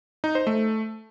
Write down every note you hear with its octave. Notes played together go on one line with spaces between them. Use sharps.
D#4
C5
A3